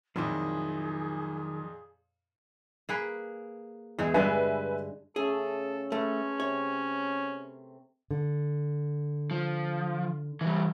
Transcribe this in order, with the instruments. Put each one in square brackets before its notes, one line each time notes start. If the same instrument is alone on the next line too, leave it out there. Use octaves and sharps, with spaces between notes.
[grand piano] F2 A#2 [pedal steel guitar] D#3 [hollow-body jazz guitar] F3 F#3 E4 [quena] G#4
[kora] A#3 G#4 B4
[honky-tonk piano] E2 [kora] E3 G#3 G#4
[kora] G2 D3 G#3 [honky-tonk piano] B4 E5 G#5
[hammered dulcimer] C#3 A3 [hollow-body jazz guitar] G#4 [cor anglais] A4
[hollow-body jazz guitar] A3 [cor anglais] C#4 [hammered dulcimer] B4 A5 C6
[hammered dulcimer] C3 [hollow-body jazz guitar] C#5
[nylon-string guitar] D3
[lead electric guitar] F3
E3 G3